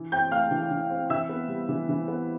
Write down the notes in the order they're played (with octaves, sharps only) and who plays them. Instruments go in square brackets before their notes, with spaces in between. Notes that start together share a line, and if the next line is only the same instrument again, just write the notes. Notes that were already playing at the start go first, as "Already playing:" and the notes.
Already playing: [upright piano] E3
C4 G5 G6
A3 F5 F6
E3
E3
C4
E3 E5 E6
B3
G3
E3
E3
B3